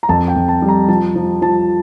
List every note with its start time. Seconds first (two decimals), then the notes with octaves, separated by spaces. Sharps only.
0.03 A#5
0.09 F2 A5
0.28 G5
0.35 F2
0.48 A5
0.62 G3
0.68 A#5
0.88 F3 A5
1.16 F3
1.42 F3 A5